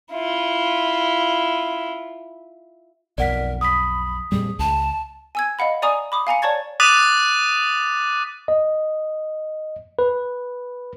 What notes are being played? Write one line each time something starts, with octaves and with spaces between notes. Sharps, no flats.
E4 F4
B1 F2 A#4 D5 F#5 B6
B5 D#6 B6
F2 A#2 G3 G#4
C#2 A5
G#5 E6 G#6
D#5 F5 F#5 B5
D5 G#5 A#5 C#6 D#6
B5 D6 D#6
F5 G#5 A#5 C#7
C#5 D5 A5 C#6 G#6 A6
D6 D#6 F#6 A6 B6 D#7
D#5
B4